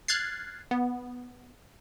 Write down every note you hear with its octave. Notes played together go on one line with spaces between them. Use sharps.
F6 F#6 G#6 A6 C7
B3